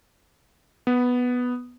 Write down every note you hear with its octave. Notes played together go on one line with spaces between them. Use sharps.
B3